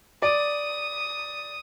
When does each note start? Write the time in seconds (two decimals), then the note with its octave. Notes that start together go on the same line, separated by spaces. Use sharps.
0.22 D5 D#6